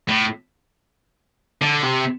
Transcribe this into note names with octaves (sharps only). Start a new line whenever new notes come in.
A2
D3
C3